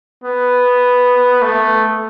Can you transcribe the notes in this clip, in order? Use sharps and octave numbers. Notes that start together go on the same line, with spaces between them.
B3
A3